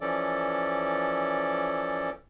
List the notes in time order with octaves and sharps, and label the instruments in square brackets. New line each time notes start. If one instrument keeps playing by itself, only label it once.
[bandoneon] E3 F3 C#4 A4 D5